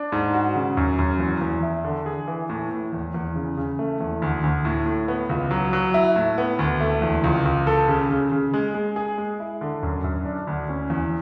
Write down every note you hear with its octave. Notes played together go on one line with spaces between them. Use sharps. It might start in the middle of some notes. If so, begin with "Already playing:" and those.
Already playing: D4
G#2
F#4
C#3
F#2
F#2
E2
E2
E4
D3
G#4
E3
A2
A2
E2
E2
C#3
C#3
A3
E2
D2
D2
A2
A2
B3
C#2
F#3
F#3
E4
A2
B3
D2
A3
E2
C#2
C#2
A4
C#3
C#3
C#3
G#3
G#3
G#4
G#3
E4
D3
F#2
F#2
D4
D2
C#4
E2